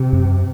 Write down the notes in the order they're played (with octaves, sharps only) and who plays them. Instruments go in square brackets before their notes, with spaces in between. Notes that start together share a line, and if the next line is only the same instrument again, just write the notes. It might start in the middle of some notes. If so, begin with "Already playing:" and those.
Already playing: [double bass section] C3
[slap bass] F#2